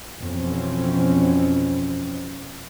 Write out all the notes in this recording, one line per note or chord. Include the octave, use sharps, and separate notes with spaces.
F2 B2 E3 C4 C#4